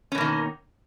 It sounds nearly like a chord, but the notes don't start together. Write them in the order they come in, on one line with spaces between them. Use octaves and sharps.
C#4 B2 A#3 D#3